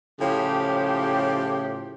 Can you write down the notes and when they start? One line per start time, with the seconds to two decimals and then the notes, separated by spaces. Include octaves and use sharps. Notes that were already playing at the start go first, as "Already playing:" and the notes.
0.21 A2 C#3 F3 G4